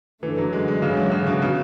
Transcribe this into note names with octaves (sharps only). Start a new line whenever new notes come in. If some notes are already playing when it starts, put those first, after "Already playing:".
F#2 D3 E3 A3
F#3
G#3
G#3
G#2 C#3 F#3 C#4 E4
D3
C#3
B2
C#3